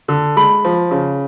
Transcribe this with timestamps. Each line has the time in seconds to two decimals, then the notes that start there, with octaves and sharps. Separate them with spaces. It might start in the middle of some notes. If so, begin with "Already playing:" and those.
0.08 D3
0.36 G#3 B5
0.64 F3
0.91 C#3